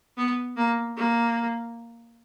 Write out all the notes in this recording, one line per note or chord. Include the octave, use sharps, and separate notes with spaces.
B3
A#3
A#3